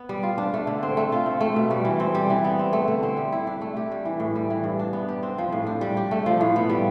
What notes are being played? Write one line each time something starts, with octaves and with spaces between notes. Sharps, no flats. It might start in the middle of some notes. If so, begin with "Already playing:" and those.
Already playing: B3
G3
F4
D4
A3
D3
C4
A3
F4
C4
A3
B2
G3
E3
C4
G3
E3
B3
C4
A3
D3
C4
G3
E4
D4
A3
G4
G3
E3
A2
G3
E3
G2
D4
B3
G4
C4
F3
A2
D4
G3
G4
A3
F3
A2
B3
G3